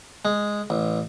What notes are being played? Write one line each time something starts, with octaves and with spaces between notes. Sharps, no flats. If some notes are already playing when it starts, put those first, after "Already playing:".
G#3
A1